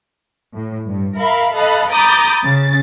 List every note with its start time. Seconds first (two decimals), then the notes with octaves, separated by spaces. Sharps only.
0.54 A2
0.87 G2
1.18 A#4 E5 F5 B5
1.54 A4 D#5 F5 A5 B5 F#6
1.90 A#5 B5 D6 D#6 G6 A6
2.43 C#3 A6